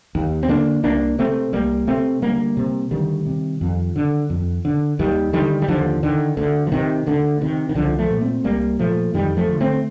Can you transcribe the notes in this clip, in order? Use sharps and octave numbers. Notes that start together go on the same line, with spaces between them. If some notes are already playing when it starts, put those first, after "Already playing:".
D#2
C4
D3 A#3 D4
C2 A#3 D4
C3 A3 C4
C2 G3 A#3
C3 A3 C4
D2 G3 A#3
C3
D2 D#3 G3
C3
F2
D3
F2
D3
D#2 D#3 G3
D3 D#3 G3
G3
D#2 D3 F3
D3 D#3
D2 D3
F3
C3 D#3
D2 D3
C3 D#3
D#3
C2 D3 F3
F3 A3
A#2
A3 C4
C2 G3 A#3
A#2 F3 A3
F2 D#3 G3
F3 A3
D3
A3 C4